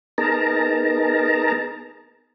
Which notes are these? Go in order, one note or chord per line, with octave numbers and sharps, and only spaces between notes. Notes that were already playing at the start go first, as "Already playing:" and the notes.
B3 D#4 G#4 A#4 A5 A#5